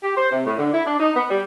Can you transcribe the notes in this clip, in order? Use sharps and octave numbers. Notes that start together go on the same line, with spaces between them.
G4
C5
C3
A2
D3
E4
D4
D#4
B3
G3